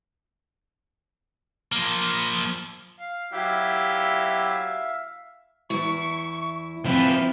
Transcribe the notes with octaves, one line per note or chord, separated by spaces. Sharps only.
F3 A#3
F5
F#3 E4 G4 E5 F5
E2 E4 C#6
F3 C4 E4 B4